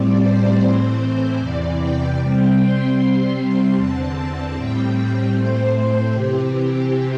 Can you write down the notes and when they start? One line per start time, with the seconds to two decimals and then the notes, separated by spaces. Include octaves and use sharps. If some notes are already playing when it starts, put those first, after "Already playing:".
Already playing: A2 G3 C4 D5
0.19 C5
0.59 A2 E3 C4
0.98 C5
1.38 E2 C3 E3 D5
1.77 G5
2.17 C3 G3 C4
2.57 C6
2.96 C3 G3 C4
3.75 E2 D3 C4 A5
4.54 A2 G3 C4 G5
5.33 A2 A3 C4 C5
6.12 C3 E3 C4 G4